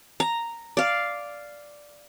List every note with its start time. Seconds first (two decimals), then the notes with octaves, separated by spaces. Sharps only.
0.20 A#5
0.77 D5 F5